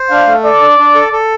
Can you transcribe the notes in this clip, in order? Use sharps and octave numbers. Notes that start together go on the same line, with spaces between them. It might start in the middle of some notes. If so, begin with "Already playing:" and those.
Already playing: C5
D4 F5
A3
A4 D5
D4
D4
A4
A4